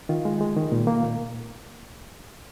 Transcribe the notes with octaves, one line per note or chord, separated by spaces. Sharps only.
D#3 F4
G#3
G#3
D#3
A#2
A#3
A#2